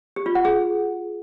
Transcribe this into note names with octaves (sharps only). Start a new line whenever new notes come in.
G4
F4
F#5
G#4